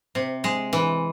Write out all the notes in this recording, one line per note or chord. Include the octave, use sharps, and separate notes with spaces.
C3
G#3
E3